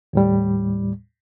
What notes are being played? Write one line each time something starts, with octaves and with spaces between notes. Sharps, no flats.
D#2 A2 G3